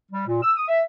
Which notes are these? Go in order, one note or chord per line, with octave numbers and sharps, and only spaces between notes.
G3
A#2
E6
D#6
E5